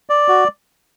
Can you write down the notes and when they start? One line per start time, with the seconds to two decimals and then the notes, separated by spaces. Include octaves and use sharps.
0.10 D5
0.28 F#4